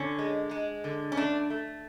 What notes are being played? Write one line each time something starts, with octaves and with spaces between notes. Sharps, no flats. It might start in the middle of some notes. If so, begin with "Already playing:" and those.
Already playing: D3 C#4
G#3
G#3
D3
C#4
A3 D4
A3